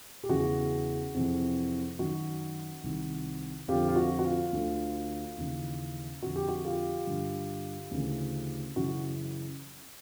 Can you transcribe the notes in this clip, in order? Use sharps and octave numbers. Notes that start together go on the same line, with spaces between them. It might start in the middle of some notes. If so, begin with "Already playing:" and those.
G4
E2 C#3 E3 F#4 G#4
F2 C3 E3
F#2 D#3 F#4
C2 C3 D#3
F2 D3 F4 G4
F4
F#4
F#4
F4
D2 D3
D#2 C#3 E3
F2 D3 F#4
G4
F#4
F4 G4
G2 D3
D2 C#3 E3
F#2 C#3 E3 F#4